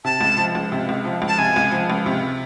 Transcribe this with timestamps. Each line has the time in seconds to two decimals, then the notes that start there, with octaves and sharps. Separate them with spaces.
0.05 C3 A5
0.21 C#2
0.38 F3
0.55 C#2
0.72 C3
0.89 C#2
1.05 F3
1.22 C#2
1.28 A5
1.38 C3 G#5
1.56 C#2
1.72 F3
1.90 C#2
2.06 C3